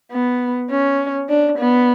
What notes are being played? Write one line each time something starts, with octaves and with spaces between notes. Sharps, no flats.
B3
C#4
D4
B3